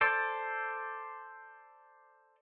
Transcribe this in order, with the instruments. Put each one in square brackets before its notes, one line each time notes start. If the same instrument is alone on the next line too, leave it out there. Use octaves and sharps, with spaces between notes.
[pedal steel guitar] A4 C5 D5